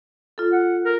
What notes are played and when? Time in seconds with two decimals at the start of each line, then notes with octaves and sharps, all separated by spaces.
0.38 F4 A4
0.52 F#5
0.85 A#4